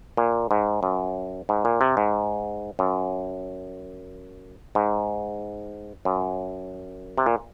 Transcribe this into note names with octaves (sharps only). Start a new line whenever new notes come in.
A#2
G#2
F#2
G#2
A#2
C3
G#2
F#2
G#2
F#2
C3
A#2